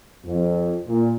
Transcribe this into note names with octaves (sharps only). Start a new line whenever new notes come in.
F2
A#2